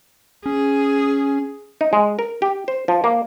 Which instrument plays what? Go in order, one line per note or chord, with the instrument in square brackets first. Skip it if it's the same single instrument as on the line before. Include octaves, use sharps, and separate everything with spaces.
[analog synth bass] C#4 [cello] G#4
[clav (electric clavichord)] D#4
G#3
A#4
G4
C5
F3
A#3